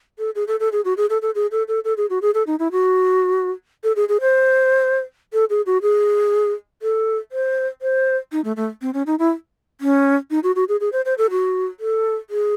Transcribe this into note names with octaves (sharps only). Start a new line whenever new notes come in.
A4
G#4
A4
A4
G#4
F#4
G#4
A4
A4
G#4
A4
A4
A4
G#4
F#4
G#4
A4
D#4
E4
F#4
A4
G#4
G#4
C5
A4
G#4
F#4
G#4
A4
C5
C5
D#4
A3
A3
C4
C#4
D#4
E4
C#4
D#4
F#4
F#4
G#4
G#4
C5
C5
A4
F#4
A4
G#4